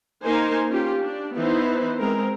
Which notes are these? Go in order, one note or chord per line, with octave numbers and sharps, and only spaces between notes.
A#3 D#4 A#4 C5 G#5
C#4 F4 G4
D4
E3 B3 D#4 E4 B4 C5
G#3 C4 A#4